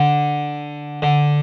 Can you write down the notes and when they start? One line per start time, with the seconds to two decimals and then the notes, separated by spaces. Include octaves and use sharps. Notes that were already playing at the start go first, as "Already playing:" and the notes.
Already playing: D3
1.02 D3